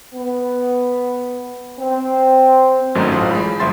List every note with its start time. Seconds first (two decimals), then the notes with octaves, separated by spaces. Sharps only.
0.14 B3
1.80 C4
2.95 G#1 F#2 D#3 F#3 A3 D#4
3.12 A1 F4 C5 D#6
3.31 G#3 B5
3.60 G1 F3 E5 C6 A6